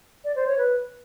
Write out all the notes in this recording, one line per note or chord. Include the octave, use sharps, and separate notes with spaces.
D5
C5
C#5
B4